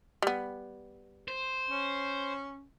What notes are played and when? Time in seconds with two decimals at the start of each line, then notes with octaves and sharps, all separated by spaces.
0.22 G3 B3
1.28 C5
1.70 C#4